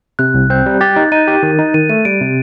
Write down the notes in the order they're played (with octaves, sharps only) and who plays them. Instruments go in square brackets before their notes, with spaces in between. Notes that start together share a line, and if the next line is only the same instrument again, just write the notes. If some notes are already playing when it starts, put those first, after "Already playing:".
[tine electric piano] C3 [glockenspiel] F#6
[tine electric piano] C2
[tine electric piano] C4 [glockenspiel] G6
[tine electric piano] G3
[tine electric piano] G4 [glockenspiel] A6
[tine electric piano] D#4
[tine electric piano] D#4 [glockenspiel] D#7
[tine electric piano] G4
D#3
D#4
[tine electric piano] D#3 [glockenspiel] D#7
[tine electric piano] A3 [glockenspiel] D#7
[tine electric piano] G3 [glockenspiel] D7
[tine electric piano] C3